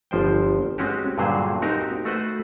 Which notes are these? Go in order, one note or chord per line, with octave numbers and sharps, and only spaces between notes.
G1 F3 C5 G5
G#3 C4 C#4 F#4 G4
G2 A#2 D3 F#3 G#4 C5
C4 D#4 F#4 G4 A#4
A3 F#4 B4 C5 F#5